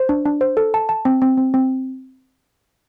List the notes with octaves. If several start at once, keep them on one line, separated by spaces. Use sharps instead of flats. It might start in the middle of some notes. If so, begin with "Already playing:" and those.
Already playing: C5
D4
D4
C5
A4
A5
A5
C4
C4
C4
C4